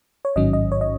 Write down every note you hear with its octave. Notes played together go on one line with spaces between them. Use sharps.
C#5
A1 G#2 D#3 F#3 C#4 D#5
D#5
C#5
D#5